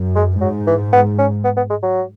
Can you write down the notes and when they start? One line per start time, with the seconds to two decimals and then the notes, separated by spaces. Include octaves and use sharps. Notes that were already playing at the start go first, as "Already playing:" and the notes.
Already playing: F#2
0.16 G#3
0.41 G#2 F#3
0.67 E3
0.93 B3
1.18 C#4
1.44 B3
1.57 B3
1.70 G#3
1.83 F#3